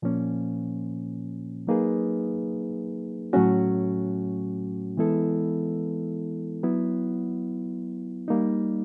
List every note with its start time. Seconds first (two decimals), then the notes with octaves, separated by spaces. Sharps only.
0.02 A#2 F3 A#3 C#4
1.67 F#3 A#3 D#4 G#4 B4
3.33 A2 F#3 A3 C#4 F#4
4.97 E3 G#3 B3 E4 A4
6.63 F#3 B3 E4
8.28 G3 A#3 D#4